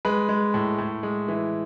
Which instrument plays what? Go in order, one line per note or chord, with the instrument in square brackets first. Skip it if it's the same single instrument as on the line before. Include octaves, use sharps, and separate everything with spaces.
[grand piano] G#3 B4
G#3
A2
A2
G#3
E3